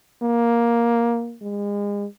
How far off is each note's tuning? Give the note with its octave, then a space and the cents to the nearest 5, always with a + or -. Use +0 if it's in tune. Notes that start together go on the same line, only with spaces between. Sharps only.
A#3 +10
G#3 -35